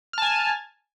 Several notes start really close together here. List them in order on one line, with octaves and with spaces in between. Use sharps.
F6 A5 G#5